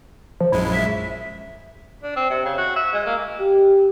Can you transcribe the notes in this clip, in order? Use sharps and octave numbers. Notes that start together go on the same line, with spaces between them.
F3
A#1 F#2 G#3 E4
E5
D4
C4
C3
C#3
F#4
E5
G#3
A#3
G4